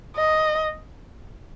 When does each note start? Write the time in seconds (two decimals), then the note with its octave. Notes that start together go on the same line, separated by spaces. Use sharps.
0.16 D#5